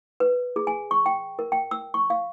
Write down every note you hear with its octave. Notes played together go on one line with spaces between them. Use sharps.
B4
G#4
G#5
C#6
G5
A#4
G5
E6
C#6
F5